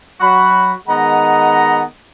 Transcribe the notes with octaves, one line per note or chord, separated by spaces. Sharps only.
F#3 F#4 B5
D#3 G#3 B3 D#5 F#5 A#5